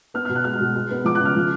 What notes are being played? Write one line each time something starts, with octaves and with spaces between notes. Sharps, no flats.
B3 F6
B2 F6
F#6
G#3 F6
B2
G#3
B3
F3 D6
F#6
C#3
F6
F3